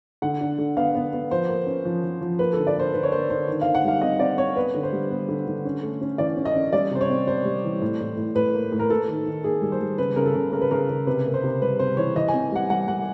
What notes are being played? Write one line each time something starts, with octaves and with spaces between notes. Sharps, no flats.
D3 F#5
D4
D3
B3 F5
B3
B3
F3 C5
A#3
C#4
F3
F3
F3
A#3 B4
D3 A4
D5
A#3 C5
D3 B4
C#5
A#3 C5
D3 C5
D#3
D#3 F5
F#5
G3 F5
C4 D#5
C4 D5
C4 C#5
B3 B4
D3
C5
G3
B3
D3
D3
C#4
A3
C#4
E3 D5
C#4
D#5
C#4
G3 D5
C3 C5
C#5
C4
C3 C5
G3
E3
A2
A2
A2
A2 B4
A#3
A2
A#4
A#3 A4
D#3
D#3
A#3 G#4
G3
C5
G3
C#3 B4
C#3 A#4
A4
C#3
C#3 A#4
B4
C#3 A#4
C#3
C3 B4
A#3
C5
C3
G3 B4
C3 C5
E3 C#5
E3 D#5
G#5
C4
G3 F#5
G3 F#5
G3 F#5